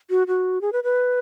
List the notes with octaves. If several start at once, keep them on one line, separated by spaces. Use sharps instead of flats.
F#4
F#4
G#4
B4
B4